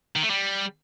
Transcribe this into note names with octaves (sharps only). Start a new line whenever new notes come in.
D#3
A3
G3